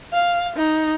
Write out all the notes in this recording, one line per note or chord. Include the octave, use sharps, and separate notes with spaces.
F5
D#4